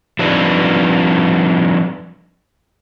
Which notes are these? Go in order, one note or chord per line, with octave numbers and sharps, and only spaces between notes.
F3 G3 C4 D4 D#4 B4